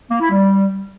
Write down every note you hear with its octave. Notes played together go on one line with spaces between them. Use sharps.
A#3
E4
G3